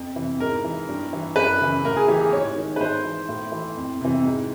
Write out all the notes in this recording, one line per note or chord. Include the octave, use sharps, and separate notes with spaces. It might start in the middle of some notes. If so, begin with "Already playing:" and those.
Already playing: F2
C3 E3
G#2 A#4
E3
G2
E3
F#2 B4
C#3 E3
A2 A#4
G#4
E3 G4
G#4
G#2 C#5
D#3
B4
G#2 C5
E3
A2
E3
F2
C3 E3
G#2